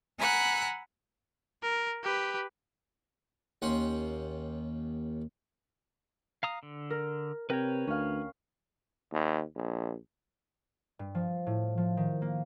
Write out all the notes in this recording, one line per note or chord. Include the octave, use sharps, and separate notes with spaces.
F#5 G#5 A#5 B5 E6 F#6
A#4
G4 B4
D#2 C#4 F#5 C6
F5 A#5 D#6
D3
A#4
C3 A#4 B4 C#5 G5
D2 C#4 F5
D#2
A#1
G2
F3
A2
F3
D#3
A#3